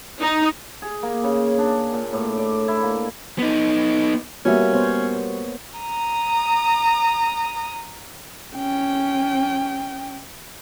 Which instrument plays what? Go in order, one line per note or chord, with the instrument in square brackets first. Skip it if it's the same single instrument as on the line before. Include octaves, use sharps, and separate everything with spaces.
[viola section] D#4
[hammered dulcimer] G#4
A#3
C#3
D4
A#2
A2
D5
E4
A#3
[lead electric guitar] B3 D#4
[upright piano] G3 F#4 E5 [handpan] A#3 B3 [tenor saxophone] C#4
[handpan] B3 C5 C#5
[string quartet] A#5 D#6
[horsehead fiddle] C#4 G5